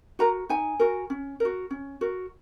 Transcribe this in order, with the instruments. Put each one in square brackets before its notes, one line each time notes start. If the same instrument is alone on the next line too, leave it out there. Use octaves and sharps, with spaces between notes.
[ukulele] F#4 A#4 A#5
D#4 G#5
F#4 A#4
C#4
F#4 A#4
C#4
F#4 A#4